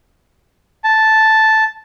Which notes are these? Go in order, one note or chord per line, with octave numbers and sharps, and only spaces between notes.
A5